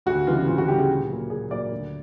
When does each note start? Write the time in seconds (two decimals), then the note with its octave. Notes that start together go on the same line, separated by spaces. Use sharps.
0.06 D2 F#4
0.27 C#3 E3 G3 B3 F4
0.48 D2 F4
0.58 F#4
0.68 C#3 E3 G3 B3 G4
0.79 G#4
0.89 A#2
1.09 F#3 A#3
1.30 A#2 G#4
1.51 F#3 A#3 D5
1.71 D2